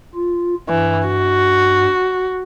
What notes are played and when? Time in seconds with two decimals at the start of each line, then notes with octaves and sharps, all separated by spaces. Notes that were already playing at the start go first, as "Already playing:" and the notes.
0.15 F4
0.69 G2 E3
1.07 F#4